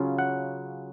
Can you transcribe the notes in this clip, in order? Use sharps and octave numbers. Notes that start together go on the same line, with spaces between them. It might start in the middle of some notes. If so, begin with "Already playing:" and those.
Already playing: C#3 F#3 C#4 F4
F#5